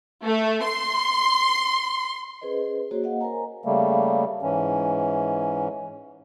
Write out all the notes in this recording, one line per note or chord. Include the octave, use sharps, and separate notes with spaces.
A3
C6
C#4 G#4 B4 C5 D#5
A#3 F#4 G#4 C5 C#5 D#5
A#3 C5 D#5 F5 F#5
A#4 C5 C#5 G#5 A#5
C#3 G3 A3 A#3
G#2 E3 C#4